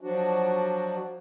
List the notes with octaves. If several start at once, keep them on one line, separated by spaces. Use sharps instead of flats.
F3 F#3 D4 F#4